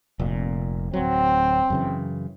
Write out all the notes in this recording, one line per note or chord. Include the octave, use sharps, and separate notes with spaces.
F1 A#2
D1 F#3 C4
F#2 C#3 E3